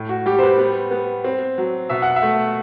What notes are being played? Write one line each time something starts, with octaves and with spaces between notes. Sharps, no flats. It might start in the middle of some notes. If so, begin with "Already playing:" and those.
Already playing: A2
F#4
G3 G4
C5
B4
B3
B3
C4
F#3
B2 E5
F#5
E5
A3